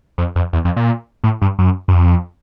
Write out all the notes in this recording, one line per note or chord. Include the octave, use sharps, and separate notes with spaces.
F2
F2
E2
F2
A#2
A2
G2
F#2
F#2
F2